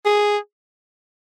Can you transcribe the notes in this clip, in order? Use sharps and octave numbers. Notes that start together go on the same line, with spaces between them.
G#4